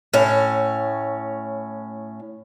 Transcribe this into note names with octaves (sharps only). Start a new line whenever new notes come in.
A2 C#4